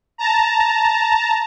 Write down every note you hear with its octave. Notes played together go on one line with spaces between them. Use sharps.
A5 A#5